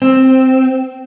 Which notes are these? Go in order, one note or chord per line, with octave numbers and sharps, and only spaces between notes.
C4